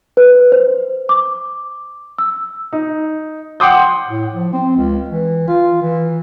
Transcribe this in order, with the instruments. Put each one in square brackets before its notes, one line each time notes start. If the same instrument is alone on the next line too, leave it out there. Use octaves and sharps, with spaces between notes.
[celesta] B4
C5
D6
E6
[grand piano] D#4
F#5 G5 C6 D6 D#6 G6
[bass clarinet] A2
F3
C4
C#2
E3
F4
E3